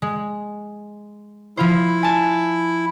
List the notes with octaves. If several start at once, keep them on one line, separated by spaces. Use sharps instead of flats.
G#3
F3 E4 F4 C5
G#5 A5